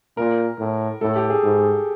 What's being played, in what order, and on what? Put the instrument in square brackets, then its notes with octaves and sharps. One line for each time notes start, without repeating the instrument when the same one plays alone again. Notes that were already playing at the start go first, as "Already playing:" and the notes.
[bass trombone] A#2 [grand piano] A#4
[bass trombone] A2
[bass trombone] A2 [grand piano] A4
[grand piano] G4
G#4
[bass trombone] G#2